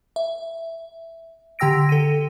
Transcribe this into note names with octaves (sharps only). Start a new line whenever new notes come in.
E5
D3 G4 G5 E6 A#6 D7
A4 D#7